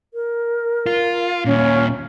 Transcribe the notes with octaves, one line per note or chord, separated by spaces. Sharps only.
A#4
F4
D#2 A#2 C#4